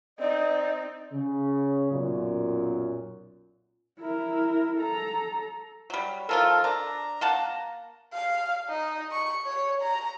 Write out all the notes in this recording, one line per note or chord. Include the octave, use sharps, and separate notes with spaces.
C4 D#4 D5 D#5
C#3
B1 F#2 A#2
E4 A#4
A4 A#5
F#3 G3
D#3 F3 F4 A4 A#4
D4 A#5
A#3 F#5 A5
F5
D#4
C#6
C#5
A#5